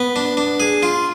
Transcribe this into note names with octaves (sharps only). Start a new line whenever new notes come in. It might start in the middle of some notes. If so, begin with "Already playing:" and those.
Already playing: B3
D4
D4
G#4
F4